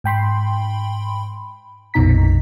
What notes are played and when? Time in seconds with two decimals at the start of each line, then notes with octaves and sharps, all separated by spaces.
0.04 G#2 G5 B5 C6
1.94 A#1 F2 B2 D#4 A#5 B6